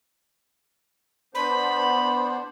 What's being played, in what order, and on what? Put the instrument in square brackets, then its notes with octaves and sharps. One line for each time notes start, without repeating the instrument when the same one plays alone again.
[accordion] B3 D4 C5 [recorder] B5